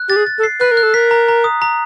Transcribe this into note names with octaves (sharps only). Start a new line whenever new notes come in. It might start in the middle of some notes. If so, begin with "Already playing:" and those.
Already playing: F#6
G4 A6
G#4
A6
A4
C7
B4 F#6
A#4
F#6
A4
A#4 B6
A#5
A#5
D#6
A#5